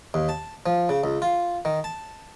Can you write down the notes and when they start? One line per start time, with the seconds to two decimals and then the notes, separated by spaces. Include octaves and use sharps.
0.14 D#2
0.29 A5
0.66 F3
0.89 C#3
1.04 C#2
1.22 F4
1.65 D#3
1.84 A5